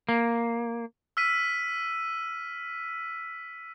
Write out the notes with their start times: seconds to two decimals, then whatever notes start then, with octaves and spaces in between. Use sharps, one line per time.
0.09 A#3
1.17 E6 F6 B6 D#7